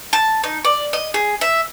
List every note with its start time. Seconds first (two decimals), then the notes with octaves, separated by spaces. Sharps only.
0.13 A5
0.44 D#4
0.65 D5
0.93 D#5
1.14 G#4
1.41 E5